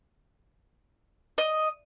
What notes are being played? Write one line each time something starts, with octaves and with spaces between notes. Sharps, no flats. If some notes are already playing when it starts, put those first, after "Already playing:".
D#5